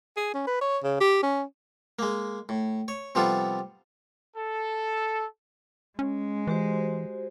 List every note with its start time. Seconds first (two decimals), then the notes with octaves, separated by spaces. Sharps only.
0.17 G#4
0.34 C#4
0.47 B4
0.61 C#5
0.84 C#3
1.00 G4
1.23 C#4
1.99 G#3 A#3
2.49 A2
2.88 C#5
3.15 C3 F3 G3 B3 F4 A4
4.36 A4
5.99 G#3 C#4
6.47 E3 F#4 G4 C5